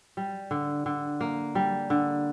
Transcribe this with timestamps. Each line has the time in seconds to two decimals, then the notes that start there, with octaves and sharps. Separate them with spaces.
0.17 G3
0.51 D3
0.86 D3
1.21 A#3
1.55 G3
1.90 D3